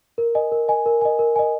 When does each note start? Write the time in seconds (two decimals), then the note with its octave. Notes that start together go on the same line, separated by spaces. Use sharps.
0.18 A#4
0.35 D#5 G#5
0.52 A#4
0.68 D#5 G#5
0.86 A#4
1.01 D#5 G#5
1.19 A#4
1.36 D#5 G#5